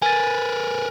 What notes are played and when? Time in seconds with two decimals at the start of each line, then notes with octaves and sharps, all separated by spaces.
0.02 A#4 B4 G#5 A6